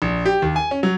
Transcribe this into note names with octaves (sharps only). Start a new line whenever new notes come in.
A#1
G4
D#2
G#5
C#4
F#3